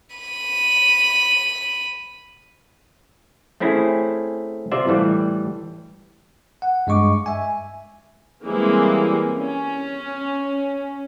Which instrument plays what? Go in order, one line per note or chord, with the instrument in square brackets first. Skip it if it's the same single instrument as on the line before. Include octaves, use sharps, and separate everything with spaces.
[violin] B5 D#7
[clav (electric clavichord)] A3 C4 C#4 E4 G#4
C3 F4 C5 D5 E5
A2 E3 G3
[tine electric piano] F#5
G2 G#3 D#5 C#6 D6
E5 G#5
[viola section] E3 G3 G#3 A#3 C4 E4
C#4